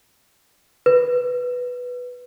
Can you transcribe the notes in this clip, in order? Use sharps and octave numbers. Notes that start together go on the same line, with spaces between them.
B4